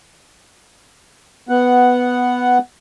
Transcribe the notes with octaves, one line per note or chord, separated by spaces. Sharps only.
B3 F#5